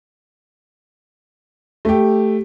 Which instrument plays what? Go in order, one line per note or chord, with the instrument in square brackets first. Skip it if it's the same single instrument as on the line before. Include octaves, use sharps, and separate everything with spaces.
[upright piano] A3 G4